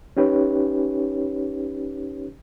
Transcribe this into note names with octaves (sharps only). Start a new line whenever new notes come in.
C#4 D#4 G4 B4 C#5